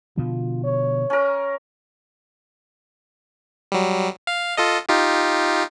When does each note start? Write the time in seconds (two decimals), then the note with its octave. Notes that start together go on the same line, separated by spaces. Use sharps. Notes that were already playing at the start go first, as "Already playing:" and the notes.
0.17 B2 D3 F3 F4
0.64 C#5
1.10 C#4 A#4
3.72 F#3 G3
4.27 F5
4.57 F4 A4 D#5
4.89 D#4 F4 G4